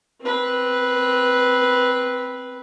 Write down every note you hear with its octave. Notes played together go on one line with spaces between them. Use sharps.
C4 B4